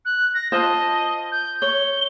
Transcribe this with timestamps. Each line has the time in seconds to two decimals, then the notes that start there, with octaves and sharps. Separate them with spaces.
0.05 F#6
0.34 A#6
0.52 F4 C5 D#5 A5
1.32 G6
1.62 C#5 G7